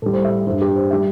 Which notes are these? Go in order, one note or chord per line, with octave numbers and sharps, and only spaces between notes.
A2 G3 A4
C5
E5
G2 G3 C5
G4
C5
G3 E5